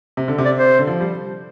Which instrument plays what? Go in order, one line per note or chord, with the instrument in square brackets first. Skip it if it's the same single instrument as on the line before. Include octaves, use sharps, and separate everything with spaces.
[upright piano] C3
D3
C3
[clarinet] D5
C5
[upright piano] D3
F3
G3